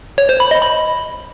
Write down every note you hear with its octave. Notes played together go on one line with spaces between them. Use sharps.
C#5
C5
B5
D#5
B5